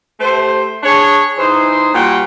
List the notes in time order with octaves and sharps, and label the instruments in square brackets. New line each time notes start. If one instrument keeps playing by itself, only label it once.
[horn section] A3 G4 C5
D4 G#4 C#5
E3 D#4 G#4 C5
A#2 G3 F#4 F#5 G5